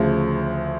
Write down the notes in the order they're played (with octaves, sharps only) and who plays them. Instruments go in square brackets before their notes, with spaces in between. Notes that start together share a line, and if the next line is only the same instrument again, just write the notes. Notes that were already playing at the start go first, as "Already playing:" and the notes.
Already playing: [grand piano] D2 C#3 F3